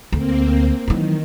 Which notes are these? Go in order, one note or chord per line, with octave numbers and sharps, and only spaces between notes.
D2 A#3 C4
D#3 E3 F#3